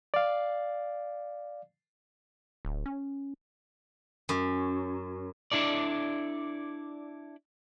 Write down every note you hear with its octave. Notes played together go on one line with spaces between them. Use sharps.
D5 F5
D1
C#4
F#2
D4 E4 A4 D5